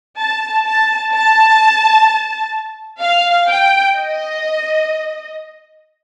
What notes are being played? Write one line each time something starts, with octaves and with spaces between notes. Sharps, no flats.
A5
A5
A5
F5
G5
D#5